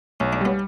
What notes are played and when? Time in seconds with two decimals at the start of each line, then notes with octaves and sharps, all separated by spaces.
0.20 B1 C#4
0.33 D4
0.41 G3 B3 C#4